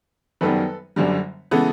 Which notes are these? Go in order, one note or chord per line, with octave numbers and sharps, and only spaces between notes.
F#1 F#2 D#3 G3 B3 A4 B4
F#1 F#2 D3 G3
C#3 E3 G#3 B3 A4